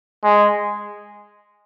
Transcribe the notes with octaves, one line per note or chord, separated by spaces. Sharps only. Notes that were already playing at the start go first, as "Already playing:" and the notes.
G#3